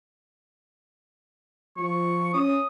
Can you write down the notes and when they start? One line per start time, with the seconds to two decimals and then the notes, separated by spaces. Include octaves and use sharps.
1.77 F3 C#6
2.34 C#4 D#6